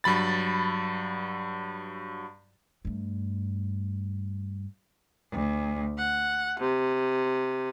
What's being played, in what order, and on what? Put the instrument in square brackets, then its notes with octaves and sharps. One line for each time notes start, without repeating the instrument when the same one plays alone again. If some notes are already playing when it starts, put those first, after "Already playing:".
[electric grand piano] G2 F#3 B5 A6
[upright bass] G2 A3
[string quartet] D2
F#5
C3